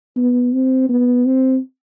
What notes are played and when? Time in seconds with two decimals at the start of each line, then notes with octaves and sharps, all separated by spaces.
0.16 B3
0.53 C4
0.89 B3
1.26 C4